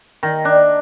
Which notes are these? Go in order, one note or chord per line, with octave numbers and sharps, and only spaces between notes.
D#3
D4